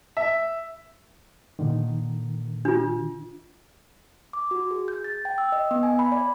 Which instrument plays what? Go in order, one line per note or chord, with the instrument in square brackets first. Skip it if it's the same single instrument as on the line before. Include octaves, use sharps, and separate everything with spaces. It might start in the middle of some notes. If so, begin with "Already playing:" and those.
[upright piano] E5
[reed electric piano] A#2 D3 D#3
[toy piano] D4 F4
[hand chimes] D6
F#4
G#4
G6
A6
G5
E6
D#5
B3
G#5
B5
D5